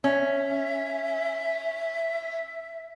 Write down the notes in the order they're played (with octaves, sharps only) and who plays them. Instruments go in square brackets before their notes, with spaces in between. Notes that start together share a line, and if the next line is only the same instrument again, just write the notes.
[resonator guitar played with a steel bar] C#4 [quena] E5